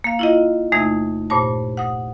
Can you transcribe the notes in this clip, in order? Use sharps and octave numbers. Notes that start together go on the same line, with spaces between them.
A#3 F5
E4 F4 D#5
E2 C3 A3 D#4 E5 G#6
G2 A#2 C5 C#5 A5
F#5 D#6